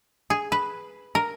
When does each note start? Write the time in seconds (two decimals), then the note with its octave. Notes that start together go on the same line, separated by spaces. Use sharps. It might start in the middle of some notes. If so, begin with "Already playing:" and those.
0.30 G#4
0.52 B4
1.15 A#4